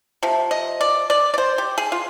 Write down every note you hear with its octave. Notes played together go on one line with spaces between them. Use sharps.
C3 F3
D#5
D5
D5
D5
C5
G4
G#4
F4